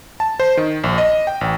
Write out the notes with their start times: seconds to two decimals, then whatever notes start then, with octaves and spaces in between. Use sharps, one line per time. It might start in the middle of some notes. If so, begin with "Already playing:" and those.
0.20 A5
0.40 C5
0.57 D#3
0.84 A#1
0.98 D#5
1.27 G5
1.41 A1